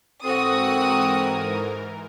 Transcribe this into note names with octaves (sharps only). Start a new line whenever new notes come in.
G#2 E3 C4 F#4 A4 A#4 C5 D#6